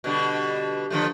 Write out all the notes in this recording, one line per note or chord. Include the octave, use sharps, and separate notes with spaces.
B2 D3 G3
D3 F3 A3